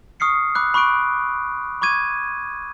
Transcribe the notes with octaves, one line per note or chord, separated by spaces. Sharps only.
C#6 D#6 F6 C7 C#7
B5 D6 E6 F#6
B5 C#6 D6 F#6 D7
B5 C#6 D6 G#6 D#7